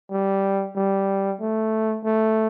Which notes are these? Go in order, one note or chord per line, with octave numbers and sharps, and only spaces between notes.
G3
G3
A3
A3